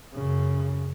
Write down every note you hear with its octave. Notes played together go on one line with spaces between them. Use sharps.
F#2 C#3